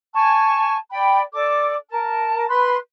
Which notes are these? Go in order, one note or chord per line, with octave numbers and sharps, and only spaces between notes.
G#5 A5 C#6
D5 G5 B5
A4 D5 D6
A#4 A5
B4 B5 C6 F#6